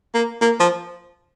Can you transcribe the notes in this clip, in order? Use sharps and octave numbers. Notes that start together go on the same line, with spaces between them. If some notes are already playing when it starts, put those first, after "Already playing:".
A#3
A#3
F3